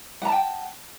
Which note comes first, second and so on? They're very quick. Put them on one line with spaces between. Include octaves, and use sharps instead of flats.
F#5 A#5 A5 G5